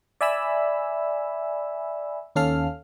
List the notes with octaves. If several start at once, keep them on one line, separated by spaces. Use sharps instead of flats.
D5 E5 G#5 B5 E6
D#2 C#4 A4 F5 F6